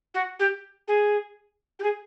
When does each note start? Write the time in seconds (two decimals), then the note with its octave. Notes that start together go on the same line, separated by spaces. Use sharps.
0.14 F#4
0.39 G4
0.87 G#4
1.79 G4
1.83 G#4